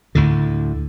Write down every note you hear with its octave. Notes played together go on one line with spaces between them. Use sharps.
D2 A2 D3